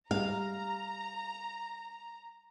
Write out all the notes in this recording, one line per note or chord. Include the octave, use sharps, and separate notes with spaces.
G3 F5 A#5